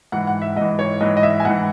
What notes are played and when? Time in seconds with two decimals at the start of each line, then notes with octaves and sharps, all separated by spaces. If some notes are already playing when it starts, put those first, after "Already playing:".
0.12 G#2 E3 F#5
0.27 F#5
0.42 E5
0.56 G#2 E3 D#5
0.79 C#5
1.01 G#2 E3 D#5
1.17 D#5
1.23 E5
1.40 G#5
1.45 G#2 E3 F#5